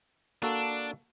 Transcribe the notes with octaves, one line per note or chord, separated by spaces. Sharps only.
A#3 D4 F#4 A4